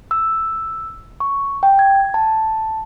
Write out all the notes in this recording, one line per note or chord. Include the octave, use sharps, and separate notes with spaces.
E6
C#6
G5
G#6
A5